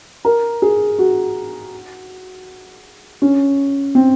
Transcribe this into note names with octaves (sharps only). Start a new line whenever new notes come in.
A#4
G#4
F#4
C#4
C4